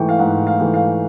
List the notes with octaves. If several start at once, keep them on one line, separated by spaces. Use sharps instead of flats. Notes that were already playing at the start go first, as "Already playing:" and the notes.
Already playing: G#2 E3 A3 G5 C#6
F5
G#2 F#5
F5
E3 A3
F5